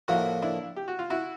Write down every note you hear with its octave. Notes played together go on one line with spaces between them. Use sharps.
A2 F3 A#3 D#4 E4 F#4
D4 E4
G4
F#4
F4
E4 F#4